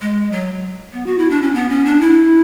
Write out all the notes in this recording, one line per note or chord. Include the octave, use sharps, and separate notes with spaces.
G#3
F#3
B3
F#4
E4
D4
C#4
B3
C#4
D4
E4